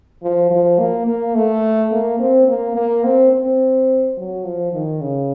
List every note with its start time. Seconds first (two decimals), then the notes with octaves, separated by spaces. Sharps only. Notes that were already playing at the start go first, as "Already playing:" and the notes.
0.23 F3
0.50 F3
0.79 A#3
1.07 A#3
1.35 A3
1.92 A#3
2.20 C4
2.48 A#3
2.76 A#3
3.04 C4
3.33 C4
4.17 F#3
4.44 F3
4.73 D#3
5.01 C#3